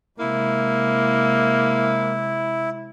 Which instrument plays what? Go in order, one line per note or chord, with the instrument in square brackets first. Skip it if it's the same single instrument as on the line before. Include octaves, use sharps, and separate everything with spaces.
[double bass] C3 G#3 [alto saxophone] A#3 [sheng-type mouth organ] E4